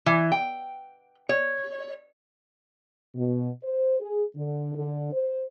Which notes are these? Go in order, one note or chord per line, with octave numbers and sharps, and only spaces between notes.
E3
G5
C#5
B2
C5
G#4
D3
D3
C5